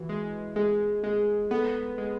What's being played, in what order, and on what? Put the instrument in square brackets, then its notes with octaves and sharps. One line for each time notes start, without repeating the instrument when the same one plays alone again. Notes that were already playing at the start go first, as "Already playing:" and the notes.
Already playing: [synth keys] E3 [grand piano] F#4
[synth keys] G#3
[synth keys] G#3 [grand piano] G#4
[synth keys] G#3 [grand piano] G#4
[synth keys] B3 [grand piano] A4
[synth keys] G#3